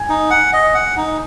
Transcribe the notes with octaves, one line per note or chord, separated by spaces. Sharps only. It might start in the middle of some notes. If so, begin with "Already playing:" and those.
Already playing: G#5 G#6
D#4
F#5
D#5
F#5
D#4